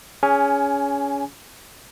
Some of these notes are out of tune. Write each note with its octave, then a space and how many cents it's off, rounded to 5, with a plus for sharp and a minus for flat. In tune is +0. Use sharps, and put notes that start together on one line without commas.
C#4 +20 G#4 +0 G#5 +0